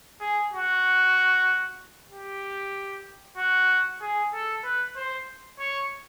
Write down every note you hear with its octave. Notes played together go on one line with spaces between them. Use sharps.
G#4
F#4
G4
F#4
G#4
A4
B4
C5
C#5